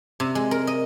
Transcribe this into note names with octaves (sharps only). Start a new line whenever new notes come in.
C3
G#3
A#4
D#5